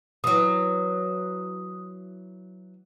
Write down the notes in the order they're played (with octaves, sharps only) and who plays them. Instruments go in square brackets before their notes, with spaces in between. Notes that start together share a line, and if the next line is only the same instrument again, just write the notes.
[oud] E3 F#3 [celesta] D#6